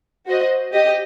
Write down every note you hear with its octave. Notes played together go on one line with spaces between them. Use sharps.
F#4 C5 D#5
G4 D#5